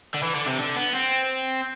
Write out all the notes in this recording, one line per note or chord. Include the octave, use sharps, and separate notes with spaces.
D3
E3
D3
C3
D3
B3
C4